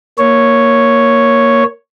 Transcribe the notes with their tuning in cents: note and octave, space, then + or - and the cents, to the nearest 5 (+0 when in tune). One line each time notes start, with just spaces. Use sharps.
A#3 +0 C#5 +0